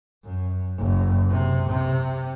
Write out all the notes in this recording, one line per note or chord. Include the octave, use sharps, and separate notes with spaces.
F#2
F#1
C3
C3